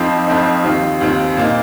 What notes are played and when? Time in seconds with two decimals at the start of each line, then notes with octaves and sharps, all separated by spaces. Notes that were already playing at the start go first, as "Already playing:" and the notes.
Already playing: F2 F3 C4 D#4
0.27 F2 F3 C4 D#4
0.63 D#2 D#3 C4 F4
1.01 D#2 D#3 C4 F4
1.37 A#2 A#3 D#4